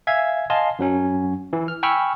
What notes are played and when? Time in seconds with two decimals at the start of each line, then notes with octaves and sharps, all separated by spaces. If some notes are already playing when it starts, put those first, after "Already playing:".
0.07 E5 F5 G#5 G#6
0.50 D#5 F5 G#5 A5 C6
0.79 F#2 F#3 C#4
1.53 E3
1.68 F6
1.83 G5 G#5 B5 C#6 E6 F6